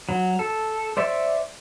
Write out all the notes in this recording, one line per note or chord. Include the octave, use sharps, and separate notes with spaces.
F#3
A4
C5 D5 E5 C#6